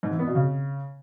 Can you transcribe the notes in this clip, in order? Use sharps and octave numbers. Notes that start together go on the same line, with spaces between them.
G#2
E3
B3
B2
C#3